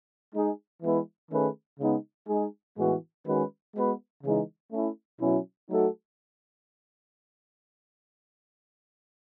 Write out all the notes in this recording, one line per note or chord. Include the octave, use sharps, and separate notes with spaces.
G#3 D#4 G#4
E3 G#3 B3 E4 B4
D#3 A3 C#4 G#4 B4
C#3 G#3 B3 D#4
G#3 D#4 G#4
A2 E3 G#3 B3 F#4
D#3 G#3 C#4 F#4 B4
G#3 B3 F#4 B4
C#3 E3 G#3 D#4
A3 C#4 E4
B2 F#3 C#4 E4
F#3 A3 D#4 F#4 A4